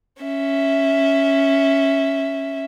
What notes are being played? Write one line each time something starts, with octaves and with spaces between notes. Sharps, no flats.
C#4 E5